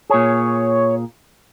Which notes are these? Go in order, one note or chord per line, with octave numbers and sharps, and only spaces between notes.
A#2 G#4 C#5